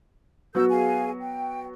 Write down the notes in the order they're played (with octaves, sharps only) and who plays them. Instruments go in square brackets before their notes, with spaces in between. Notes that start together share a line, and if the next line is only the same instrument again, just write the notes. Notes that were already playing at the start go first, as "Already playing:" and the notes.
[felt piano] F#3 B3 F#4 [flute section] A#4 E6 G6
[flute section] G#4 F5 G#5
G5